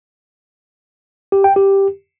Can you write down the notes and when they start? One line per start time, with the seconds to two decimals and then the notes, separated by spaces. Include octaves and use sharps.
1.32 G4
1.44 G5
1.56 G4